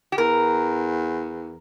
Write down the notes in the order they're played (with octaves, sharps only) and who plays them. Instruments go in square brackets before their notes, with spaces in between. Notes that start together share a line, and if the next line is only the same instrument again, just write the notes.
[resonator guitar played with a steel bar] G4
[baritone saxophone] E2 [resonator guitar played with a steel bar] A#4